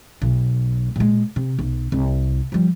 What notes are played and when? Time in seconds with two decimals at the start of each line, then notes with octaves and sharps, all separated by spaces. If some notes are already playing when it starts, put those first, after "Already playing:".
0.22 B1
0.96 A#2 G#3
1.36 C3
1.59 B1
1.92 C2
2.52 F3 G3